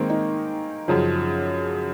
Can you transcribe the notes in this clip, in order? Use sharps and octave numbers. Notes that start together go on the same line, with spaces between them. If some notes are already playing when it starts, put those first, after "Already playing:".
Already playing: D#3 G#3 A#3 C4
D#4
F#2 C#3 F3